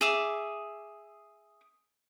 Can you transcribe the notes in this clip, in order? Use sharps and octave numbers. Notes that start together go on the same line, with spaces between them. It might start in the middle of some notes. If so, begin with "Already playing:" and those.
G#4 E5 D6